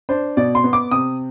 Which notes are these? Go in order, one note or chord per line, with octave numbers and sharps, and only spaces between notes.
D4 C5
B2 D5
C6
B3
D6
C3 D#6